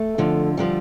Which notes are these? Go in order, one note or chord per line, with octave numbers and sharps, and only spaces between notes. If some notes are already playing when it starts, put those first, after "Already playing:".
Already playing: A3
F2 D3 F3
D3 F3 G3